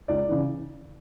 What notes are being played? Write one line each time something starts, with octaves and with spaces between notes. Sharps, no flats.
C#2 D5
C#3 E3